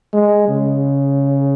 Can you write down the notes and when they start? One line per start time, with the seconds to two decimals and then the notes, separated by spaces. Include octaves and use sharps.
0.13 G#3
0.49 C#3